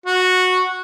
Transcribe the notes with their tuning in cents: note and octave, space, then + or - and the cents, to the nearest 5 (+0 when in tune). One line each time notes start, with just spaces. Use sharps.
F#4 -10